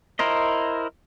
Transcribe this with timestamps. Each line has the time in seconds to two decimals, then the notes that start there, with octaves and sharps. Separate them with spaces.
0.19 E4 A#4 C5 D#5